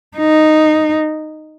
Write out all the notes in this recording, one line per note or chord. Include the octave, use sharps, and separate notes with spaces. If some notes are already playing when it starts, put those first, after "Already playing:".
D#4